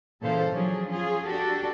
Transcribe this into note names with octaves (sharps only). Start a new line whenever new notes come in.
A#2 C#3 E3 A4 C5 F5
F3 F#3 C#4 D4 G#4
C#4 F4 G#4
D4 F#4 G4 A4